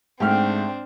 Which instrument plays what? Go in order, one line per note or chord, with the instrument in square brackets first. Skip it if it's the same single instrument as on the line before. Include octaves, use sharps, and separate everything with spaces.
[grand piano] G#2 F6 [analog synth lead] A3 [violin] C4 D4 [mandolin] G4